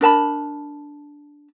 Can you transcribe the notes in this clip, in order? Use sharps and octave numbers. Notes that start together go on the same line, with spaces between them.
D4 A#4 A5 B5